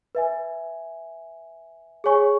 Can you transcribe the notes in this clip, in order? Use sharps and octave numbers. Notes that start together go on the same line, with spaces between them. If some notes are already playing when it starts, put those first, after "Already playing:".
B4 E5 G#5
G#4 C#5 G#5 C#6